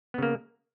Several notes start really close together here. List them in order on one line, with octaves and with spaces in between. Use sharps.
B3 C#3 A#3